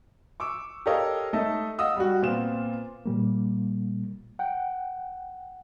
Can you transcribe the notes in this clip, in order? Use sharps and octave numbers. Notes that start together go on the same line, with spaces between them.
C#6 D6 E6
G4 A4 A#4 C#5 D#5 F5
A3 D#4 A4 D#5 E5
D#5 F5 F#5 D#6 E6
G3 F#4
A#2 B3 C4 F4 E7
A#2 G3 A#3
F#5 G5